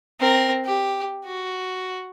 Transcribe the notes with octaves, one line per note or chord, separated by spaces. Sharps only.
C4 A#4
G4
F#4